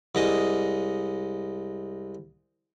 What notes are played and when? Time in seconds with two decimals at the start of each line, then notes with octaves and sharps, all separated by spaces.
0.15 C2 G#3 D#5